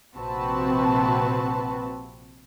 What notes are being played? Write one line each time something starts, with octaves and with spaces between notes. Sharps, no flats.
A#1 C3 C4 F#4 B4 A5